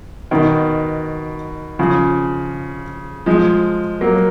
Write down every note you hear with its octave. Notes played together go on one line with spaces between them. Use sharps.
B2 D#3
C#3 F3
F3 G#3
F#3 A#3